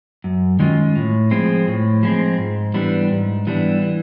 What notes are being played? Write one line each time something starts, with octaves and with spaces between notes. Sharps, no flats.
F#2
D#3 G#3 C#4 F4
A2
F3 G#3 C4
A2
F3 G#3 C4
G#2
E3 G3 B3 D4
G#2
E3 G3 B3 D4
E3